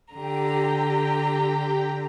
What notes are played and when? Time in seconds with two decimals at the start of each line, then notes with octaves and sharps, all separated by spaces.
0.13 D3 G4 G5 A#5